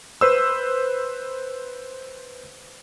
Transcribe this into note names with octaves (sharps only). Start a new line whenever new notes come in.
B4 C5 E6